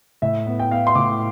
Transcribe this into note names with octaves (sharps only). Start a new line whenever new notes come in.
A2 E5
B3
G5
B3 F5
C6
A2 D6